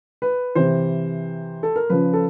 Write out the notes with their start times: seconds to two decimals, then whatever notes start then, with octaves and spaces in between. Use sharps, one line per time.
0.22 B4
0.55 C3 E3 C5
1.63 A4
1.76 A#4
1.90 C#3 F3 B4
2.14 A4